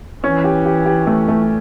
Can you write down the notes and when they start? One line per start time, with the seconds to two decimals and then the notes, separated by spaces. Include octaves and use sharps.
0.24 E3 C#4
0.44 G4
0.66 G4
0.86 G4
1.07 A3
1.28 A3